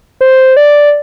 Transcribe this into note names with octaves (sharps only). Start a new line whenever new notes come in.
C5
D5